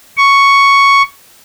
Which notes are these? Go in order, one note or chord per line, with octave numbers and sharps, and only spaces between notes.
C#6